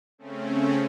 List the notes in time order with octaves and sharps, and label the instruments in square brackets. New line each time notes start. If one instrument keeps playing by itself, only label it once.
[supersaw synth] C#3 A3 C4 C#4